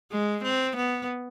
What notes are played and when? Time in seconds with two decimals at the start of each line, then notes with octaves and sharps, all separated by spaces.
0.11 G#3
0.44 C4
0.76 B3